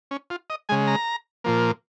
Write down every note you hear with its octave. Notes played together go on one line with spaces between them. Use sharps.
C#4
F4
D#5
C#3 G#3 G#5
A#5
A#2 F3 A#3